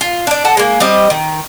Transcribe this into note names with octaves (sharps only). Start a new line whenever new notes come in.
F4
D4 D5
A4 F#5 A5
G#3 A#3
G3 C4 D#5
D#3